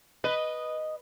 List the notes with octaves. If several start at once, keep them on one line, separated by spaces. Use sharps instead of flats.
B4 D#5